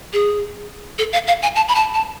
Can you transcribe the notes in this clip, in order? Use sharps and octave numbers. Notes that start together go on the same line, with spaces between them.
G#4
A4
F5
F5
G#5
A5
B5
A5
A5